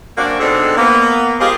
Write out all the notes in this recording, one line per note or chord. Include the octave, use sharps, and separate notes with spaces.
F#2 A#3 C4 D4 F#4 D5
B2 G#3 C4 D4 D#4 A4
A#3 B3
G#3 F4 G4 G#4 A#4 C5